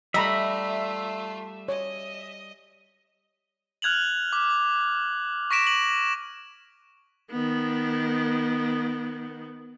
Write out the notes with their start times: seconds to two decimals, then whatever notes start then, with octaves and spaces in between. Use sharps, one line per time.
0.14 G3 A3 F4 D#5 E5 A#5 B5
1.69 C#5 D#5
3.82 F6 F#6 G#6 F7 F#7
4.33 D6
5.51 C#6 A#6 B6 D7 E7
5.67 F#7
7.31 D#3 B3